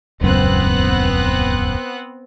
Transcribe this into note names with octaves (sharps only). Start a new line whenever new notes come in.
D#1 C#2 F#2 B3 C4 F#6